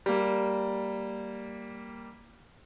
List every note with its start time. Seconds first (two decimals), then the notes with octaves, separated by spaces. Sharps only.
0.06 G3 A#3